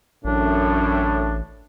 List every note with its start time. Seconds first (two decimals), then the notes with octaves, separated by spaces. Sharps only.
0.24 A1 F#2 A2 D4